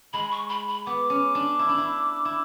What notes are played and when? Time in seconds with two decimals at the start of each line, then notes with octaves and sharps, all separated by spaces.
0.13 G#3 B5
0.32 C#6
0.49 B5
0.68 B5
0.86 B3 D6
1.10 C#4
1.35 D4
1.59 E4
1.69 D4
1.78 E4
2.25 E4